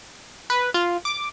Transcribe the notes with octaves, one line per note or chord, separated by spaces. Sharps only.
B4
F4
D6